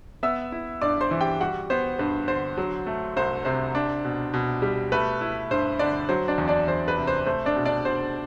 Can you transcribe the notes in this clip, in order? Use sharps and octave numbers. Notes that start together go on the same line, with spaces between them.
B3 E5 E6
E4
G2 D5 D6
C5 C6
E3
G4 G5
G3 F#4 F#5
B3 C5
G2 B4
D3 C5
F#3
A3
C2 C5
C3 C5
D4
B2
B2
G3
A3 B4
E4
G2 C5
D3 D4 D5
F#3 C5
D4 D5
E2
D4 D5
E2 C5
B4
C3
C5
A3 C5
D4 D5
B2
D4 D5
B2 C5